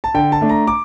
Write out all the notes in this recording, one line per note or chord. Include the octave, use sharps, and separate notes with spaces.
A5
D3 G5
A5
A3 D4
A#5
D6